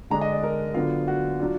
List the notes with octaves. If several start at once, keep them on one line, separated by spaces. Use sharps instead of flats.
D3 G#3 D4 A#5
D#5
D5
A#4
D3 F#3 B3 D4 F4
F#4
F#3 D4 F4